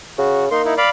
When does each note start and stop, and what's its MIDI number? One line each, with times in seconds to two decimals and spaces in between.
0.18 0.49 49
0.18 0.45 66
0.51 0.78 58
0.51 0.62 63
0.51 0.62 84
0.65 0.74 63
0.65 0.74 64
0.78 0.90 74
0.78 0.90 77
0.78 0.90 83